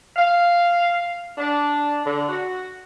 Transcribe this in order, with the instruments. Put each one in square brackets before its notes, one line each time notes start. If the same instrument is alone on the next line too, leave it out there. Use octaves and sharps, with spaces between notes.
[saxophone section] F5
D4
D3
F#4